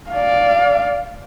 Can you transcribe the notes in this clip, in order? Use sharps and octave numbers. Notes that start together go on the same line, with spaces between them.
D5 F5